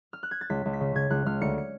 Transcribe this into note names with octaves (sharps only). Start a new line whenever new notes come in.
F6
F#6
G#6
A6
C#2 B6
C#2
B6
C#3
C#3 G#6
C#2 F#6
C#2 F6
D2 C#7
C#7